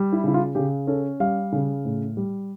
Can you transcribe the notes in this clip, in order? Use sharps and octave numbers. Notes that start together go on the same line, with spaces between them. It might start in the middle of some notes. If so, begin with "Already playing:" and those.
Already playing: G3
E4
C#3 E4
F4
C#3 G4
C#4 A4
G3 F5
C#3
A2
G3